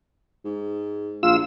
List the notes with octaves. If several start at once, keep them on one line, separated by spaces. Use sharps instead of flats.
G#2
A#1 F4 E6